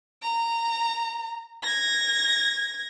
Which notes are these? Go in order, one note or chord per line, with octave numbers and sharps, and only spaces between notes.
A#5
G#6 A#6